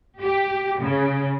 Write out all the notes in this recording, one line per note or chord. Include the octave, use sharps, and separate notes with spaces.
G4
C#3